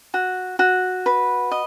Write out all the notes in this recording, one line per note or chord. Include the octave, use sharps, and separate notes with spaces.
F#4
F#4
B4
D#5